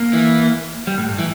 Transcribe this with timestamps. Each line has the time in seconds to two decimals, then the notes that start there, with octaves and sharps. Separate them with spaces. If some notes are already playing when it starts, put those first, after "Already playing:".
Already playing: A#3
0.13 E3
0.87 G3
0.98 A2
1.08 G2
1.19 E3